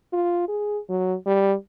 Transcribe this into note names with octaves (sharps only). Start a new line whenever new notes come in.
F4
G#4
F#3
G3